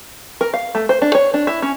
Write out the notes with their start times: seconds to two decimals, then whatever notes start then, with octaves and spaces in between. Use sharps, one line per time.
0.41 A#4
0.54 F5
0.75 A3
0.89 C5
1.02 D4
1.15 C#5
1.34 D4
1.47 E4
1.62 C#4